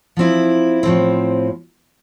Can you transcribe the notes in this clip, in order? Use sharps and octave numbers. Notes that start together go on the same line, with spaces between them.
F3 C4 E4
A2 F3 C4